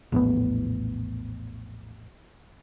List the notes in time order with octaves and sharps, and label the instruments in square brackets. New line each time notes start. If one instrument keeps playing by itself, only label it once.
[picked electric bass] A#1 E2 A2 B3